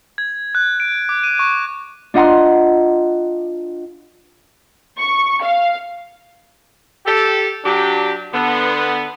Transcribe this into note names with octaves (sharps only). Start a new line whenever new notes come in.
G#6
F#6
D7
D6
D#7
C#6
D4 F4 D#5 F#5 A#5 C6
C#6
F5
G4 A4
F#3 D4 G4
D3 B3